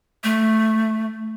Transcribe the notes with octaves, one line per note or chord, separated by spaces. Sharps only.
A3